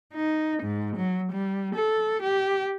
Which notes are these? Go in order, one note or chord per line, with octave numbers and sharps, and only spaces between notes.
D#4
G#2
F#3
G3
A4
G4